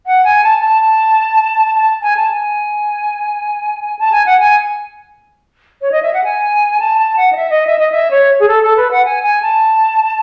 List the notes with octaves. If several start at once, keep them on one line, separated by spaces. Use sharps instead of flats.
F#5
G#5
A5
A5
A5
G#5
A5
G#5
A5
G#5
F#5
G#5
C#5
D#5
E5
F#5
G#5
A5
A5
F#5
D#5
E5
D#5
E5
D#5
E5
C#5
G#4
A4
A4
B4
F#5
G#5
G#5
A5